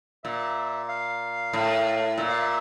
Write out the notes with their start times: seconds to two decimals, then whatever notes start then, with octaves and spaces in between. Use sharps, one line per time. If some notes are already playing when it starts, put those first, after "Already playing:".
0.24 A#2 E5
0.89 F5
1.53 A2
2.18 A#2 E5
2.29 F5
2.40 E5